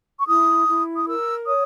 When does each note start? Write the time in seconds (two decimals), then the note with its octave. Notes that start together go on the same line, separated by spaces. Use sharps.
0.18 C#6
0.27 E4 D#6
0.67 E4
0.97 D#6
1.07 A#4 E6
1.46 C#5 D#6